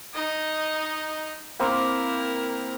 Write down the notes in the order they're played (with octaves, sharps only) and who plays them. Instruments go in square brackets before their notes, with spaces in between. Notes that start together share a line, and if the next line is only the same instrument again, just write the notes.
[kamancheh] D#4 D#5
[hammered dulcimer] A#3 C4 C6 [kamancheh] E4 A#4